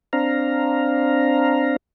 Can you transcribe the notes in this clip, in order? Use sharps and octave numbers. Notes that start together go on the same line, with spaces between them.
C4 D4 F5 A#5